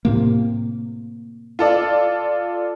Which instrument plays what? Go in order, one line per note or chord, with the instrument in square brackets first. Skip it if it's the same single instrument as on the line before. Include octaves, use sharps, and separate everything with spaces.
[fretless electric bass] A2 C3 A#3
[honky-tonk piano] F4 A4 D5